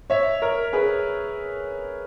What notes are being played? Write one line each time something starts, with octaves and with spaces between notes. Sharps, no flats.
C#5 E5
A#4 C#5
G#4 B4